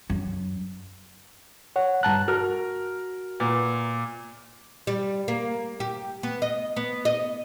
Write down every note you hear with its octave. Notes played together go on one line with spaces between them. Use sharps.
F#2
C#5 F#5
G2 A5 A#5 F#6
F#4 A#4 F6
A#2 B3
G3
A#3
G4
B3
D#5
B3
D#5